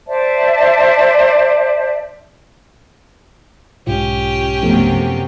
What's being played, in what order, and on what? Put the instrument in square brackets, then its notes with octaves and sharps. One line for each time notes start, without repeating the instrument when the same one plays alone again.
[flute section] C5 D5 E5 A5
[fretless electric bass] B1 G#2 G#3 [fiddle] C#4 G4 [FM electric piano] F4
[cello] F#2 C3 [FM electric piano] F3 A3 B3